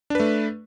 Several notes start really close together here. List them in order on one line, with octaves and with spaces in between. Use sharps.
D4 B4 A3